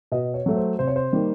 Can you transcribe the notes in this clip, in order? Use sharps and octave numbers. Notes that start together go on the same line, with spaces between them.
B2 D#5
C#5
F#3 A3
C5
C3 C5
C#5
C5
D#3 G3 A#3